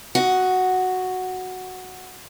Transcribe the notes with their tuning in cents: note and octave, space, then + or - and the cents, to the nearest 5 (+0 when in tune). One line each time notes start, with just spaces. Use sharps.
F#4 +0 D#5 +20